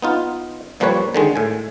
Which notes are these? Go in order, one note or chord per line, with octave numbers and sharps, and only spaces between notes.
B3 D#4 F4
A#2 F3 G3 A#3 B4 C#5
D3 D#3 G#3
A2 G#5